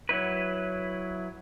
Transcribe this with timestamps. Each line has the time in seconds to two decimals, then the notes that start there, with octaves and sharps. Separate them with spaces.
0.09 F#3 E4 B4